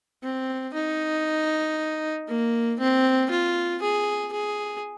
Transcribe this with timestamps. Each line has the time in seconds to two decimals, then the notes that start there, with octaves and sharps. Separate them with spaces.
0.24 C4
0.74 D#4
2.28 A#3
2.80 C4
3.31 F4
3.82 G#4
4.33 G#4